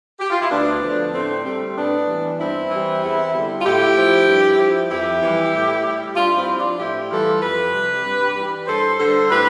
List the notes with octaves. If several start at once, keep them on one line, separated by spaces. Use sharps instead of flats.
G4
F4
E4
D2 B3 D4
D3 F3
A2 A3 C4
G3 A3 C4
A2 B3 D4
E3 G3
G2 C4 E4
E3 G3
E2
D3 G3
F4
A2 E4 G4
F3
G2
F3
F2 E4 G4
E3 G3
A2
G3
G2 D4 F4
C4 E4
F3
D4 F4
A2 E4 G4
E3 G3 F4 A4
F2 G4 B4
C3 G3
G2
E3 G3
G2 A4 C5
D3 G3 A4 C5
A2 G4 B4